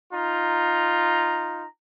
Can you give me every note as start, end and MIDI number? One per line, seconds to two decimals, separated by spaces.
0.13 1.65 63
0.13 1.65 65
0.13 1.65 82